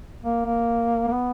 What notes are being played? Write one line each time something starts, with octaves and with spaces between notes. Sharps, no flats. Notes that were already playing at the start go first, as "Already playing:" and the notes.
A#3
A#3
A#3
B3